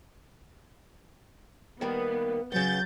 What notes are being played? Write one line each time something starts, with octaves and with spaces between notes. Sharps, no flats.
D#3 G3 A#3 B3
C#3 F#3 B3 G6 A6